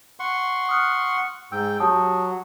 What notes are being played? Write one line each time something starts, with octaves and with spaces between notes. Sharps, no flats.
F#5 C6 C#6
D#6 F6 F#6
G#2 G5 E6
F#3 G4 A5 D#6